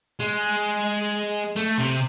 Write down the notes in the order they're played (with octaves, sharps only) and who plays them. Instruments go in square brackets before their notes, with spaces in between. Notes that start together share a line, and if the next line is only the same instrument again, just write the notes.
[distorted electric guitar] G#3
A3
C3